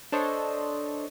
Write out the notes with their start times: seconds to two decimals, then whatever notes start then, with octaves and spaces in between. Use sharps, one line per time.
0.12 D4 A4 C5 C#5 D#5